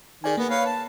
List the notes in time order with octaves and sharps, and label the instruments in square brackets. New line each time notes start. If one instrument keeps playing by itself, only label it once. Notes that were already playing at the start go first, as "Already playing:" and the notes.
[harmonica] D#3 [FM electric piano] G#4 D5 G#5
[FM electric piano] A#3 [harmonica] B3
[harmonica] B4 C#5 F5
A5